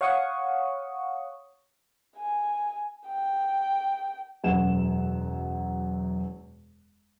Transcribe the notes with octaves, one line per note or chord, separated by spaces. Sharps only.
C#5 F5 F#5 C#6 D#6
G#5
G5
E1 F#2 F#5 E7